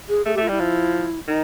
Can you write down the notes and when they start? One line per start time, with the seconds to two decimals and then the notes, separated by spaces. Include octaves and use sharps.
0.09 G#4
0.26 A3 G#4
0.34 G4
0.38 A3
0.43 F4
0.49 G3 E4
0.60 F3
1.27 D#3 D#4